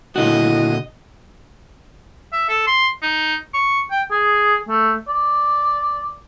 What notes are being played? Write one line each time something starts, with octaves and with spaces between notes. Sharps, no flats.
A#2 D3 E4 F#4 D#5
E5
A4
C6
D#4
C#6
G5
G#4
A3
D5